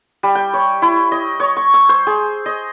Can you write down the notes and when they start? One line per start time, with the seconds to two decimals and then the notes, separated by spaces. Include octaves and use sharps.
0.23 G3
0.35 G5
0.53 C#5
0.82 E4
1.12 D#5
1.40 C#5
1.57 C#6
1.74 E6
1.89 C5
2.07 G#4
2.46 D#5